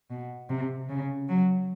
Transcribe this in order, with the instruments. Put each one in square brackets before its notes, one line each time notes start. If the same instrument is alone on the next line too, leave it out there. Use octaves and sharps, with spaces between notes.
[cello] B2
C3
C#3
F#3